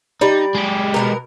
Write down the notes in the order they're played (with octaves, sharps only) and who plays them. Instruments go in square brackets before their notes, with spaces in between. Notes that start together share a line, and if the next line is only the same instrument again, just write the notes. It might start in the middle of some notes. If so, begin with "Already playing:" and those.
[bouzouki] G3 D5 [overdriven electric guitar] D#4
[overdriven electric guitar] G#3 G4
[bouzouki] B2 D#3 A#4